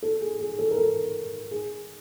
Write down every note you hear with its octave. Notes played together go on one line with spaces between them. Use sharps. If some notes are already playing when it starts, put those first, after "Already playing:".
A4
G#4
G#4
A4
A#4
A4
G#4